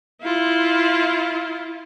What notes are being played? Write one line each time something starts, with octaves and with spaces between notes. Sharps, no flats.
E4 F4